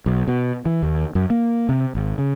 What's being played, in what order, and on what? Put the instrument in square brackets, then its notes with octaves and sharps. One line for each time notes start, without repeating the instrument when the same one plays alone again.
[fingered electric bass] B1
B2
E3
D#2
F#2
A#3
C3
G#1
C#3